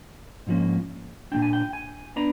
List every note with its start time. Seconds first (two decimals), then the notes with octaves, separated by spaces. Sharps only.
0.47 G#2 F3 A#3 C#4
1.32 A#2 G3 A#3 D4 G5
1.42 G#5
1.53 G5
1.73 G#5
2.16 B3 D4 A#5